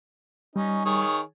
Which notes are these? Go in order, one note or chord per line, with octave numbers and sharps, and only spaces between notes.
G3 C#4 D#4
D#3 G#4 C#5